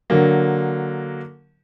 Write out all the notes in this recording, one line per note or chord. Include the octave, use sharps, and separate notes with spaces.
D3 F#3 A#3